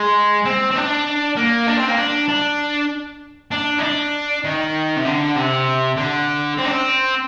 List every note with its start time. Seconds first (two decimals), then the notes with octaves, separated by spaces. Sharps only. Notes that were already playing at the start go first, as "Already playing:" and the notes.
Already playing: G#3
0.45 C4
0.71 C4
0.76 D4
1.37 A#3
1.67 D4
1.77 C4
1.88 A#3
1.98 D4
2.29 D4
3.51 D4
3.78 D#4
3.83 D4
4.44 D#3
4.96 C3
5.05 D3
5.36 C3
5.97 D3
6.58 C4
6.65 D4
6.72 C4